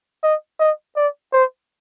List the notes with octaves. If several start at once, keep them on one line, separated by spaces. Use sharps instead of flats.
D#5
D#5
D5
C5